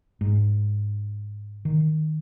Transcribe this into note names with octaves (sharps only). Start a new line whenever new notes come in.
G#2
D#3